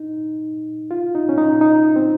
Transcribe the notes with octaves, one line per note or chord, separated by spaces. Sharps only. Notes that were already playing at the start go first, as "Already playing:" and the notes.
Already playing: D#4
F4
D#4
C#4
D#4
D#4
C4